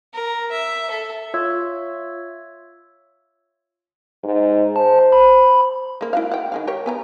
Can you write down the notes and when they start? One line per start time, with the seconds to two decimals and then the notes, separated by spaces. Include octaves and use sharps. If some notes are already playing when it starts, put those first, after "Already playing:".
0.13 A#4
0.51 E5
0.90 A4
1.34 F4 C#5 E5 E6 G#6
4.24 G#2
4.76 C5 A5
5.12 B5
6.01 G#3 A#3
6.13 E4 F#4 F5
6.32 F#5 G5
6.52 D#3 G#3 F5
6.67 G4 A#4 C#5
6.86 B3 G#5 A#5